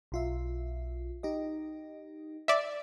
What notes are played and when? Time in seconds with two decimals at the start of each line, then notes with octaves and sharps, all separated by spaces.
0.12 B1 F4 E5
1.23 D#4 G4 D#5
2.48 D5 E5